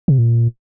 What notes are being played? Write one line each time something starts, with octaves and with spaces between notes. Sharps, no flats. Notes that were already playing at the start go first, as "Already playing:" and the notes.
C3
A#2